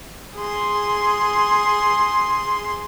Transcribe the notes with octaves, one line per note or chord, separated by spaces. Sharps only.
G#4 C6